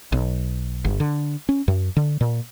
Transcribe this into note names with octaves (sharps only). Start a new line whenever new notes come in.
B1
G1
D3
C#4
F#2
D3
A#2